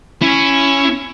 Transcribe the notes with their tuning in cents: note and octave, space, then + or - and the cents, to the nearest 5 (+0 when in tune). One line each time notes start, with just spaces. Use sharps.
C#4 +0 E4 +15